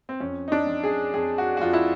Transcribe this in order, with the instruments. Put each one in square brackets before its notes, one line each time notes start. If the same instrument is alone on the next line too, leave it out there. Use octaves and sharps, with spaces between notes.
[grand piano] C4
F2 C#4
D#4
D4
F2
G#4
F2 G#4
F#4
F#4
F2 F4
E4